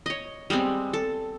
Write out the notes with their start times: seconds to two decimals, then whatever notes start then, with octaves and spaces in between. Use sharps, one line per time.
0.06 C#5 D#5
0.50 G3 G#3 B3 C4
0.93 A4